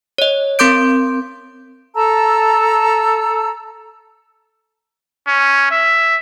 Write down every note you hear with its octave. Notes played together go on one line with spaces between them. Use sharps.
C#5 D#5
C4 A#4 C6 D6 G6 D7
A4 A5 A#5 E6
C#4
E5